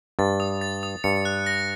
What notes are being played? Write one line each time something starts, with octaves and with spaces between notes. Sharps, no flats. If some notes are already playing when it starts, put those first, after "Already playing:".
G2 A6
D#6
A6
D#6
G2 C#7
F#6
A#6